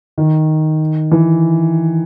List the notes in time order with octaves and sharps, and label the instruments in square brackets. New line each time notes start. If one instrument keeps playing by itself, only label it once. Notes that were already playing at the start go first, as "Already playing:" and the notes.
[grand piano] D#3
E3